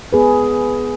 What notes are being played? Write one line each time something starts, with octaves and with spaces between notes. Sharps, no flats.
B3 G#4 B4